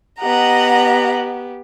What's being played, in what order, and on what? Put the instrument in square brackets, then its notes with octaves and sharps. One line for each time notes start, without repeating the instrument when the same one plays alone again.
[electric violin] B3 G4 [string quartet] D#5 F#5 A#5